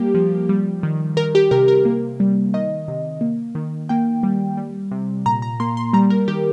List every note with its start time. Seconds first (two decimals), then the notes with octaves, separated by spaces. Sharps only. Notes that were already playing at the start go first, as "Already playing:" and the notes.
Already playing: G3 A#3 G4
0.15 F3
0.49 G3
0.83 D#3
1.17 D#3 A#4
1.35 G4
1.51 C3 A#4
1.68 A#4
1.85 A#3
2.20 G3
2.54 D#3 D#5
2.88 C3
3.21 A#3
3.55 D#3
3.89 A#3 G5
4.23 G3
4.57 G3
4.91 C3
5.26 A#2 A#5
5.42 A#5
5.60 A#3 C6
5.77 C6
5.93 G3 A#5
6.10 A#4
6.28 D#3 G4